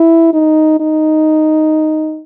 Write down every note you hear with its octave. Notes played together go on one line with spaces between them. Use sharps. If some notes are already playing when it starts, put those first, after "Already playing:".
Already playing: E4
D#4
D#4